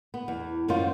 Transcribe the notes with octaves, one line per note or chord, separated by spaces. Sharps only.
B3
E2
F#2 D#3 C4 F4